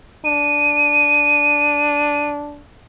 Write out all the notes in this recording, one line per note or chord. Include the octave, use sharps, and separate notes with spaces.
D4 D#7